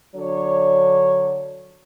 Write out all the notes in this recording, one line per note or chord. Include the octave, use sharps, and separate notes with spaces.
D3 F#3 D4 C#5